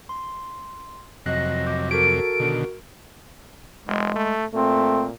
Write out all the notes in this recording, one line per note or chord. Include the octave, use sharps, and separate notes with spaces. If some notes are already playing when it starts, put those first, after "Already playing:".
C6
F2 C3 F#3 D#5 F#6 A#6 C7
D6 G6
F#4 A4 A#4 D7
B2 D3 D#3
F1 G#3
A3
A#2 A3 C4